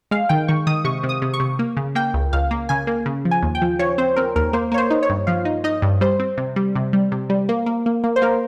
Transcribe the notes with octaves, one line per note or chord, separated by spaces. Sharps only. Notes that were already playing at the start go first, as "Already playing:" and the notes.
G#3 F5
D#3 G5
D#3 C#6
D#3 D#6
C3 C#6
C3
D#6
C3
C#6
C3
A#3
C#3
A#3 G5
C#2
C#2 F5
A#3
C#3 G#5
A#3
C#3
F3
G#5
D#2
G5
F3
F3 C#5
C4 C5
C4 A#4
D#2 A#4
A#3 C5
A#3 C#5
C5
D#4
C#5
G2
F3 F5
D#4
D#4 D#5
G2
G3 C5
C4
C3
G3
C3
G3
C3
G3
A#3
A#3
A#3
A#3
C5
A#3 A#4